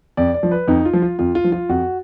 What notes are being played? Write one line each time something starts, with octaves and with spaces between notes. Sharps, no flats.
F2 D5
D5
F3
B4
F2 D#4
F4
F3
F4
F2 F4
F4
F3
F4
F2 F#4